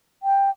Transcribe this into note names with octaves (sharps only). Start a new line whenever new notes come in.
G5